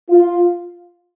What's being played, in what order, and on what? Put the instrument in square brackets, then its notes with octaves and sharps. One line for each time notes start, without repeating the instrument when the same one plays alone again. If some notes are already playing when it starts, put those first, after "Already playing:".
[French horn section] F4